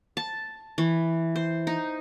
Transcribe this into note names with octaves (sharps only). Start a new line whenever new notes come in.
A5
E3
C5
D#4